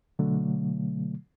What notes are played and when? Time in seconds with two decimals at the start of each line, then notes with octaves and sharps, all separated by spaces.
0.19 B2 D3 F#3 A3